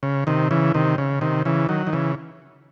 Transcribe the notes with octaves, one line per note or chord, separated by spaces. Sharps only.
C#3
C3 D#3
C#3 E3
C3 D#3
C#3
C3 D#3
C#3 E3
D#3 F#3
D#3
C#3 E3